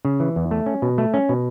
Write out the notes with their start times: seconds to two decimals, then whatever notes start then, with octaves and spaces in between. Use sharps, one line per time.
0.05 C#3
0.20 E3
0.36 E2
0.51 A3
0.66 C#4
0.82 B2
0.98 A3
1.14 C#4
1.29 B2